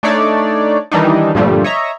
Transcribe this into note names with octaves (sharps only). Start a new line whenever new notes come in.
A3 D4 D#4 C#5 D5
D#3 E3 G3 D4 D#4
G2 A#2 D3 F3 G3 A3
C#5 D#5 E5 A#5